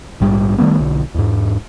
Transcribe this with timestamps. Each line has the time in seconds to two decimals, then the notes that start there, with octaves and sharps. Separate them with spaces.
0.20 A#1 G#2 G3
0.58 D#3 G3 A3 B3
0.79 B1 D3
1.14 E2 G#2